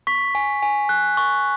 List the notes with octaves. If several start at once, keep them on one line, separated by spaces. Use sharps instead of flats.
C#6 B6
G#5
G#5
F#6
C#6